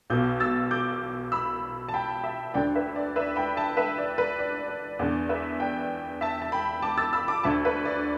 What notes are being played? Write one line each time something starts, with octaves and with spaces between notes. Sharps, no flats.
B1 B2 D6 G6
E6 A6
D6 G6
B5 E6
A5
G5 B5
E5 A5
D2 D3 D5 G5
B4 E5
D5
B4 E5
G5 B5
E5 A5
B4 E5
D5
B4
D5
D5
E2 D3 D5
B4 E5
D5 G5
E5 A5
A5
G5 B5
A5 D6
E6 A6
B5 E6
A5 D6
D2 D3 E5 A5
B4 E5
D5